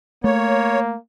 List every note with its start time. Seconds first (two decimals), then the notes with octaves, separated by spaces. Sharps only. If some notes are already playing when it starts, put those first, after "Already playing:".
0.24 A3 A#3 C#5